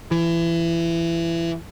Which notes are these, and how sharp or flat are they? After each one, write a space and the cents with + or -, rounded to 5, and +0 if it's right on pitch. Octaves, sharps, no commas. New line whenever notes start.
E3 +25